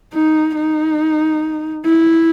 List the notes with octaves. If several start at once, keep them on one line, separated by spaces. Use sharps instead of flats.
D#4
D#4
E4